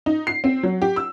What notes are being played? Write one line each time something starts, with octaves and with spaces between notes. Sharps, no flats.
D#4
C7
C4
F#3
G4
E6